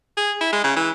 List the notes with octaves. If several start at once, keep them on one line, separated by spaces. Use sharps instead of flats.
G#4
E4
G#3
C#3
E3